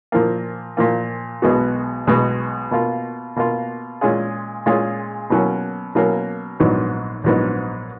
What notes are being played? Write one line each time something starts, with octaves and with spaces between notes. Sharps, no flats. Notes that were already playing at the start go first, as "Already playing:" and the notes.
A#2 F3 A#3
A#2 F3 A#3
B1 B2 G#3 B3 F#4
B1 B2 G#3 B3 F#4
B2 A#3 F4
B2 A#3 F4
A#2 G#3 C#4 F4 G#4
A#2 G#3 C#4 F4 G#4
B2 F#3 A#3 C#4
B2 F#3 A#3 C#4
A#1 G#2 F#3 B3 D#4
A#1 G#2 F#3 B3 D#4